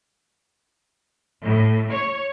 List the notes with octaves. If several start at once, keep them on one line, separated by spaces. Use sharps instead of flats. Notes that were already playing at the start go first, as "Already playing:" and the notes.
A2
C#5